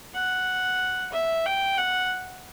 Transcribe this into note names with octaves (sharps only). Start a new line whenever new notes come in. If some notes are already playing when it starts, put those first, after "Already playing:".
F#5
E5
G5
F#5